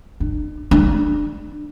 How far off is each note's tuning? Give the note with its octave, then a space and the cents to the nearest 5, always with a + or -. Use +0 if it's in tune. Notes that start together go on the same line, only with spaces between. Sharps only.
D4 +45
D4 +25